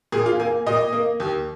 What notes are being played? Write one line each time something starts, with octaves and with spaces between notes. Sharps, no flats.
A#2 G#4
F4
A#3 G#5
A#2 D#5
A#3
D#2